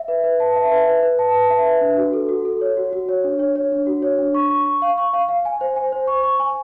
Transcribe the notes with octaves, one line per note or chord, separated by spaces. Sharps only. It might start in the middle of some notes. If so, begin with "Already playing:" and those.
Already playing: E5
B4
B4
A5
E5
B4
B4
B4
A5
B4
E5
B4
D4
F#4
A4
F#4
A4
C#5
F#4
F#4
C#5
D4
C#5
C#5
D4
F#4
C#5
D4
C#6
C#6
C#6
F5
C#6
F5
F5
G#5
C5
G#5
C5
C#6
C#6
G#5